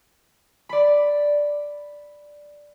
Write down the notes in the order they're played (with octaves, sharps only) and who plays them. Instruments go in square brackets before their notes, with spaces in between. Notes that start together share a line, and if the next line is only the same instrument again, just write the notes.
[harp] D5 B5